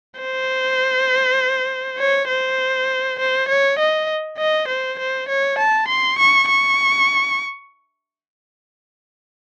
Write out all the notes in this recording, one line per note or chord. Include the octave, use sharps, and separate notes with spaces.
C5
C#5
C5
C5
C#5
D#5
D#5
C5
C5
C#5
A5
C6
C#6
C#6